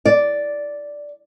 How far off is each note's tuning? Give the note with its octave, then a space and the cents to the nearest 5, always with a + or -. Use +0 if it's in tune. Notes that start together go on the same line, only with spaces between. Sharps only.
D5 -5